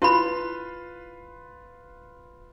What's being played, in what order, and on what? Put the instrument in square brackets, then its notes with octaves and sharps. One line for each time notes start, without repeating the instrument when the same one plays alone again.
[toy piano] E4 B5 [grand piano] F4 B4 C6